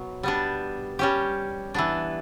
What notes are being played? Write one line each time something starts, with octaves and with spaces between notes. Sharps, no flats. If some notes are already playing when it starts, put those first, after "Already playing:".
Already playing: B2 F#3
G3 B3 D4
G3 C#4 G4
E3 B3 D4